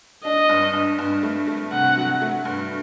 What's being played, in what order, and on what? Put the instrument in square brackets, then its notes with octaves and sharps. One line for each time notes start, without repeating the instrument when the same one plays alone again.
[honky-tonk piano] D4 [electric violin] D#5
[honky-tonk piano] G2
G2
G2
A3
A3
[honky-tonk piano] C3 [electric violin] F#5
[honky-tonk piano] F#3
A3
G2